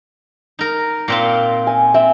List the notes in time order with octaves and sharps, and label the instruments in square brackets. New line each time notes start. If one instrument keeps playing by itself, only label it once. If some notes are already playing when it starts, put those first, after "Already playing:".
[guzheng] D#4 A#4
A#2 C4 F4
[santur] G#5
[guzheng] C4 [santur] E5